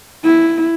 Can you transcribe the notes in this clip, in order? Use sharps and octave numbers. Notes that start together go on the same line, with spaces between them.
E4